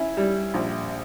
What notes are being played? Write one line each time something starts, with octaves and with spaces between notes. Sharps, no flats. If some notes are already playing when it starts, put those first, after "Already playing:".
Already playing: C#4 E4
G3
A#1